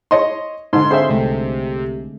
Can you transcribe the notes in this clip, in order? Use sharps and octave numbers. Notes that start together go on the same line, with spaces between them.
C#5 D#5 C6
G#2 D3 D#4 C6
C4 G#4 A4 C5 C#5 E5 F5 G5
C2 C3 G#3 A3